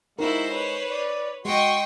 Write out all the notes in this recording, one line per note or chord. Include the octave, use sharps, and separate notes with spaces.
G#3 D#4 E4 F#4 A#4 C5
B4 C#5
D5
G#3 F#4 D#5 G5 C6 C#6